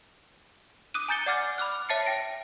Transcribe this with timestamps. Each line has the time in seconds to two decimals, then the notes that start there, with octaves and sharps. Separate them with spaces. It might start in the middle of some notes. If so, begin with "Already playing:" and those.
0.94 D6 D#6 F#6 D#7
1.08 G#5 A#5 G6 A6 C#7 G7
1.26 D5 F#5 D6 F6 A6
1.58 B5 D6 F6 F#6
1.89 C#5 E5 A5 A6 C7 C#7
2.06 G5 A#6 D7